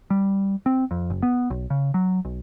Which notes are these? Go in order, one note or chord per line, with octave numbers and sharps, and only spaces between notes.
G3
C4
F2
F#1
B3
B1
C#3
F#3
B1